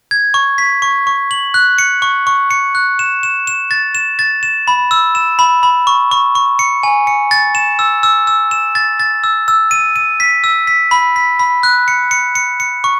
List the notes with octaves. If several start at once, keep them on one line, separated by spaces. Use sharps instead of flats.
G#6
C#6
B6
C#6
C#6
F#7
F#6
C#7
C#6
C#6
C#7
F#6
E7
E7
E7
A6
E7
A6
E7
B5
E6
E7
B5
B5
C#6
C#6
C#6
C#7
G#5
C#7
A6
E7
E6
E6
E6
E7
A6
A6
E6
E6
D#7
D#7
B6
E6
B6
B5
B6
B5
F#6
C#7
C#7
C#7
C#7
C#6